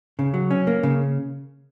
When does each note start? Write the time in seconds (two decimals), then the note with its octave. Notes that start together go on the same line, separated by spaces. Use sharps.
0.19 C#3
0.34 F#3
0.50 C#4
0.67 A#3
0.83 C#3